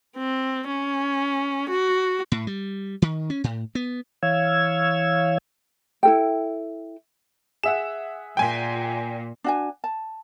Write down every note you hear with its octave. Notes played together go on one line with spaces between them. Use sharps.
C4
C#4
F#4
A2
G3
D#3
C#4
A2
B3
E3 C#5 F5 E6 G#6
E4 A4 G5
G#4 E5 F#5 E7
A#2 G5 G#5
D4 F#4 G#5
A5